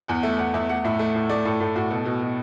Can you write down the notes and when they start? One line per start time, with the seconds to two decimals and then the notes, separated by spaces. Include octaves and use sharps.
0.08 E2 F#5
0.23 A3 E5
0.38 E2 F#5
0.54 E2 E5
0.69 A3 F#5
0.84 A2 E5
0.99 A3
1.14 A2
1.29 A3 D5
1.45 A2 A4
1.60 A2 A4
1.76 A2 F#4
1.90 B2 A4
2.05 B2
2.21 B2